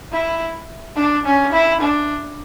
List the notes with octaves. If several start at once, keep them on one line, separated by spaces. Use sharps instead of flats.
E4
D4
C#4
E4
D4